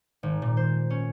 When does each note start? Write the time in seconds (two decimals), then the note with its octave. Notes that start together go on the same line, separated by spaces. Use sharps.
0.23 G#1
0.42 A#2
0.57 C5
0.90 C#4